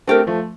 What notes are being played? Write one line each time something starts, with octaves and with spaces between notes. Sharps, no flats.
A3 C4 D4 G4 A#4
F3 A3